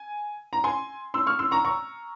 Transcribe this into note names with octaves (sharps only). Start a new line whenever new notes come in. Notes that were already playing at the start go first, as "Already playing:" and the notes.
Already playing: G#5
A#5
G#5 C6
C6 E6
C#6 F6
C6 E6
A#5 C#6
A#5 C#6